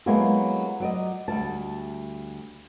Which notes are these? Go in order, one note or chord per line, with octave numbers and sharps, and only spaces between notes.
F#3 G#3 A#3 B3 E4 G4
F#3 D5 D#5
D2 G3 A5